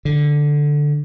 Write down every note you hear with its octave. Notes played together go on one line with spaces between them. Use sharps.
D3